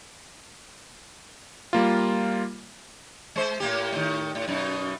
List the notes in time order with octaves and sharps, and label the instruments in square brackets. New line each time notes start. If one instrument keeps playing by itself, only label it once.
[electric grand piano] G3 A#3 F4
[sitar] G#3 C5
A2 A#3 G4
A2 D#3
A2
F#2 B2 D#4